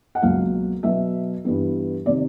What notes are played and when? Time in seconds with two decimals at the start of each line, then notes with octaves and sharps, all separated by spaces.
0.15 F#5
0.22 C#2 B2 F#3 A#3 F5
0.83 B2 F#3 B3 E5
1.45 G2 E3 G3 B3
2.06 C3 D#3 D5